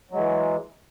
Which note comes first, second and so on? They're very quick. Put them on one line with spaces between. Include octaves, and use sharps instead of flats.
F#3 G#3 E3